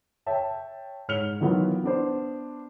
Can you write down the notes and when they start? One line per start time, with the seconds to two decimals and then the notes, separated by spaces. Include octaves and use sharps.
0.26 C#5 E5 G5 A5
1.08 G#2 C#5 F6 C#7 F7 G7
1.40 D#3 E3 F#3 B3 F4
1.84 B3 D4 C5